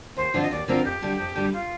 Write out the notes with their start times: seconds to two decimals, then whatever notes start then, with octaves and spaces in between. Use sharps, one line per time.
0.17 D#2 C5
0.34 D3 F3 C4 F4
0.42 D#5
0.51 D#2 D5
0.67 D3 F3 C4 F4 A#4
0.85 F2 G4
1.02 D3 G3
1.19 F2
1.35 D3 G3
1.53 F4